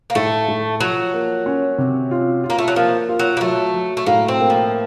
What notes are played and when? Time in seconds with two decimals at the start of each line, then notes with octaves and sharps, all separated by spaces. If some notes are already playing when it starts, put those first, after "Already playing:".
0.10 A#3
0.15 A2 A3
0.48 A2
0.80 F3 F#3
1.14 A#3
1.46 C#4
1.78 C3
2.11 F4
2.44 F4
2.50 A#3
2.58 A3
2.68 F#3
2.76 F3 A#3
3.09 F4
3.19 F#3
3.37 A#3
3.41 F#3 A3
3.74 F#3
3.97 A3
4.07 A2 A#3
4.28 C4
4.39 A#3
4.50 F3